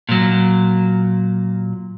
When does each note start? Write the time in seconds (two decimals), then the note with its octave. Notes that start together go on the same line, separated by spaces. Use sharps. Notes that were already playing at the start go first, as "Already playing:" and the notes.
0.09 A#2 F#3